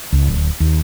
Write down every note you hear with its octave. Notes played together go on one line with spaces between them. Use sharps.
C#2
D1
D#2